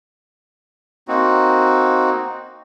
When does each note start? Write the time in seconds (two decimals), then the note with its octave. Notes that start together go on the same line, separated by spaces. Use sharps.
1.08 A#3 C4 D#4 F#4